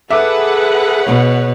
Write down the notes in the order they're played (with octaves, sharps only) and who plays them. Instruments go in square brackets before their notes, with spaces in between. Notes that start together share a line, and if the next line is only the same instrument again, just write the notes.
[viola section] G#4 B4 F#5 [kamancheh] A4 [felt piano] E5 D6
[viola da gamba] B2 [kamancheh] C#5